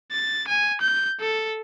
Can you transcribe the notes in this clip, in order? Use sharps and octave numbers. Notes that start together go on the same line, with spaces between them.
A6
G#5
G6
A4